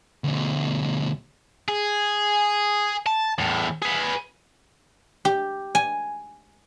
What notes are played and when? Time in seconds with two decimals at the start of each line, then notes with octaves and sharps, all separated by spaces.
0.24 D2 B2
1.68 G#4
3.06 A5
3.38 E2 A2
3.82 G#4 B4
5.25 G4
5.75 G#5